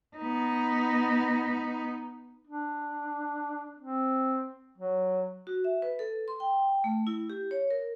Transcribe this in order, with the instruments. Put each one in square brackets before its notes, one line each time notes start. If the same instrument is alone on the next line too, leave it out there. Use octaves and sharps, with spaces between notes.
[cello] B3 D#4
[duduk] D4
C4
F#3
[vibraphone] F#4
E5
B4
A4
C6
G5
A3
E4
G4
C#5
A#4